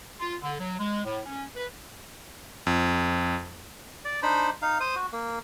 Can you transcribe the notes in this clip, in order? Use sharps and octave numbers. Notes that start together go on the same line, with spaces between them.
F4
D3
F#3
G#3
A2
C#4
B4
F2
D5
D4 D#4 C5 B5
D#4 F5
C5 D#6
F#4
A#3